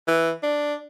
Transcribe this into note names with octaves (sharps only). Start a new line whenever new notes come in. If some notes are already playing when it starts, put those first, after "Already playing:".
E3
D4